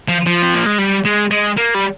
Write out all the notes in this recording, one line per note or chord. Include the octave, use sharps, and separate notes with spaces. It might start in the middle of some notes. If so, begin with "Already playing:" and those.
F3
F3
C4
A#3
G#3
G3
G#3
G#3
A#3
G3